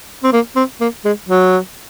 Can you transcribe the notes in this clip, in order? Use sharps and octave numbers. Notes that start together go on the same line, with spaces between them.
C4
A#3
C4
A#3
G#3
F#3